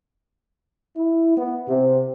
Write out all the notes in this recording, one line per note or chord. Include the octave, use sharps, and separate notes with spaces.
E4
B3
C3